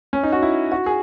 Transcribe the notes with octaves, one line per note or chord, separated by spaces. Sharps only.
C#4
D#4
F#4
E4
F#4
G#4